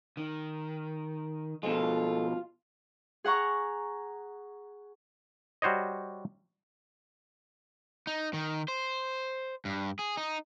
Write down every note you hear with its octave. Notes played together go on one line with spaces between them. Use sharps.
D#3
B2 F3 G#3 F4 A4
G#4 F#5 A#5 C#6
G3 F#4 C5 C#5 D#5
D#4
D#3
C5
G2
G#4
D#4